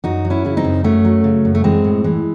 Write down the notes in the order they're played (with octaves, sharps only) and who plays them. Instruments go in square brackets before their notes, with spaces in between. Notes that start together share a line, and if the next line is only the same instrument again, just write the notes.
[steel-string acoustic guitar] F#2 D#4 F#4
F#3
C#4 E4
C#3 E4
C4 D#4
F#2
F#2 A3 C#4
F#3
C#3
F#2
A3
E3 G#3 C4
A2
E3 G#3